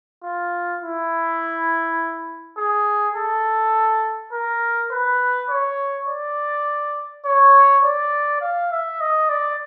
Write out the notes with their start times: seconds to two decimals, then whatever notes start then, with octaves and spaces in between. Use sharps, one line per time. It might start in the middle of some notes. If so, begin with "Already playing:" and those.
0.24 F4
0.82 E4
2.58 G#4
3.16 A4
4.33 A#4
4.91 B4
5.50 C#5
6.08 D5
7.25 C#5
7.84 D5
8.42 F5
8.72 E5
9.00 D#5
9.29 D5